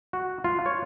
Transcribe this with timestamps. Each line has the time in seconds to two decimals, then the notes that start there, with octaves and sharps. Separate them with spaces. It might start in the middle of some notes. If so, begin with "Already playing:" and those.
0.13 F#4
0.44 F4
0.66 C#5